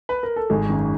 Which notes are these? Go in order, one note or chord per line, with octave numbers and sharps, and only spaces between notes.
B4
A#4
A4
G#1 G#3 G#4
F#2 D#3